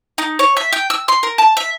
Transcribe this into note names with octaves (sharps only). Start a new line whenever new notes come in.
D#4
C#5
E5
G5
E6
C6
A#4
A5
E5